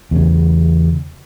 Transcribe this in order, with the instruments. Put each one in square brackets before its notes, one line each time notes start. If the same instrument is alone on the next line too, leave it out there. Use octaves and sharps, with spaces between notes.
[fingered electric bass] E2 C#3